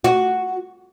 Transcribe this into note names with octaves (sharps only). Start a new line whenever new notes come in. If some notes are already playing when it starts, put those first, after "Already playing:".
F#4